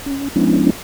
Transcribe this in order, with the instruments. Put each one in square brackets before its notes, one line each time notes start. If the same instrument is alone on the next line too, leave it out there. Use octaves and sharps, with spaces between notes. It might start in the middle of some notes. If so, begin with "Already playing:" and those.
[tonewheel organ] C#4
F3 G#3 B3 C#4 D4 E4